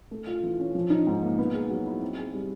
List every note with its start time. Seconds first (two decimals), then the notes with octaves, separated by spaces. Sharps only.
0.11 A3
0.27 F4
0.43 E3
0.59 C#4
0.75 F3
0.90 D#4
1.07 G#2
1.22 A#3
1.38 B3
1.53 G#4
1.70 F#3
1.86 E4
2.01 C4
2.18 G#4
2.34 G3